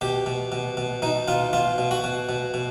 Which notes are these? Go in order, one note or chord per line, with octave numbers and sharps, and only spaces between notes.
B2 G4
B2
B2
B2
B2 D#4
B2 F4
B2 F4
B2
F#4
B2
B2
B2